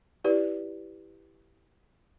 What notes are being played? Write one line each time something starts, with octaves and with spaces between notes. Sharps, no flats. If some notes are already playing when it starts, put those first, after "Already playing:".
E4 G4 B4 D5